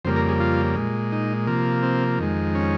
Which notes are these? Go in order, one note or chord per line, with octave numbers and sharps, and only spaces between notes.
F2 C#3 G3 A#3 C5
A#4
G#4
F4
A#2 G#3
D#4
C3 F3 A#3
C4
F2 D#3 G#3
C#4